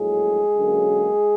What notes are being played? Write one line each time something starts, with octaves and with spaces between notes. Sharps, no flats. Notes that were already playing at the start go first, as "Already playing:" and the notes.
Already playing: A#1 A2 F#3 G#3 G#4
F#2 D3 F#3 A#3